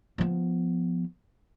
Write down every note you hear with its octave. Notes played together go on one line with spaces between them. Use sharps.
F3 B3